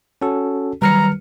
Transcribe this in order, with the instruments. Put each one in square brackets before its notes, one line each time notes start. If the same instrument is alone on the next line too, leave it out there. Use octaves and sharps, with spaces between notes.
[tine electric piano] C#4 F#4 A4
[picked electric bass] D#3 F#3 G3 [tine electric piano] B4 F6 C#7 [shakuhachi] A#5